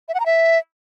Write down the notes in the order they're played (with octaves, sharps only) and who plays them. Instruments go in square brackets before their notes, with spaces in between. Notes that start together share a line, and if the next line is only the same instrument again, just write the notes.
[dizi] E5
F#5
A#5
E5